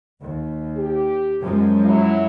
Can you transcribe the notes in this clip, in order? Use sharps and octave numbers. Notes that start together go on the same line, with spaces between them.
D#2
G4
F#2 F3 G#3
F#3 E4